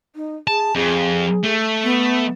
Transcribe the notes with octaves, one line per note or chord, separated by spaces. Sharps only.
D#4
G#4 A5
F2 G#4
A3
B3